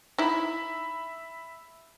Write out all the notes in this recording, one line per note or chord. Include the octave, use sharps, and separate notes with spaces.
D#4 E4 E5 B5